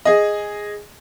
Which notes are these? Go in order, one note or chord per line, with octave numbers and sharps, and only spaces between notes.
G#4 D#5